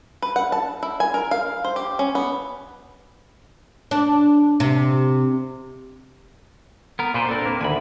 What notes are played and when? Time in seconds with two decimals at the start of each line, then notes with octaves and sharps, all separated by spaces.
0.22 B4
0.36 F#5
0.52 A5
0.83 E4
1.00 G#5
1.14 A#4
1.31 F5
1.64 C5
1.76 G4
1.99 C#4
2.15 B3
3.91 D4
4.60 C3
6.99 B3 A#4
7.14 A#2 F4 B4 C5
7.29 C4 D4 A4 A#4 D5
7.46 A#3 B4
7.61 D2 D3 D#3 G#5 B5